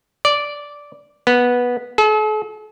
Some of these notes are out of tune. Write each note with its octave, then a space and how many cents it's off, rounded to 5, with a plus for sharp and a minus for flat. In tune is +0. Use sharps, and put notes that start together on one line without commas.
D5 -10
B3 -10
A4 -45